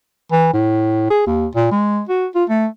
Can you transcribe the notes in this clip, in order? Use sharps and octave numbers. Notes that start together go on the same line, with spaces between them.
E3
A2
G#4
D#2
A#2
G#3
F#4
F4
A3